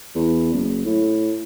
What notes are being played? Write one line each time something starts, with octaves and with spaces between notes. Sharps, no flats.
E2
F#1
A2